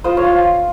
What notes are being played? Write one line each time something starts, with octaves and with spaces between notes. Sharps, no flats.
F4 C5 D#5
C#5 F5
F4